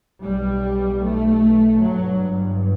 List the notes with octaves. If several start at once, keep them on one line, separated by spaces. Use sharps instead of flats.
B1 B2 G3
A3
G1 G2 F#3